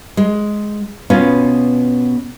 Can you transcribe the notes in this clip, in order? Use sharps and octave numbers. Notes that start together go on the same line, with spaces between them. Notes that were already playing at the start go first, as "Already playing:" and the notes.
G#3
B2 B3 C#4 F4